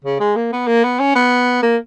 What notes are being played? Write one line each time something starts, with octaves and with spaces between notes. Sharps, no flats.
C#3
G#3
A#3
B3
A#3
B3
C#4
B3
A#3